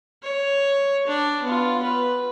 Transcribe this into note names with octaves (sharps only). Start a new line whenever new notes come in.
C#5
D4
B3 F4
B4